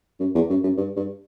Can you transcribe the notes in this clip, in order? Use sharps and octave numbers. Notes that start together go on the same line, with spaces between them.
F#2
E2
F#2
F#2
G2
G2